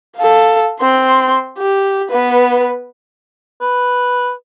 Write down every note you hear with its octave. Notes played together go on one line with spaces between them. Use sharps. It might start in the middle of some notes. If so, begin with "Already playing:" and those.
A4 F5
C4 C6
G4
B3 B4
B4